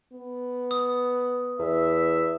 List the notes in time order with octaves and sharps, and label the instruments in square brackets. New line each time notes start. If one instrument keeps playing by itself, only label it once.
[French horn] B3
[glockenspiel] D#6
[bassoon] E2 [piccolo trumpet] E5